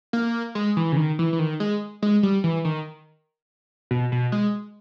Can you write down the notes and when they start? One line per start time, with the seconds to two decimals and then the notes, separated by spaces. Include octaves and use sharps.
0.13 A#3
0.55 G#3
0.77 E3
0.92 C#3
0.97 D#3
1.19 E3
1.33 E3
1.39 D#3
1.60 G#3
2.02 G#3
2.23 G3
2.44 E3
2.65 D#3
3.91 B2
4.12 B2
4.32 G#3